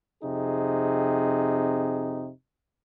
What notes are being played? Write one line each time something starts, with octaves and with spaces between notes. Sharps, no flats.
F2 C3 D#4 G#4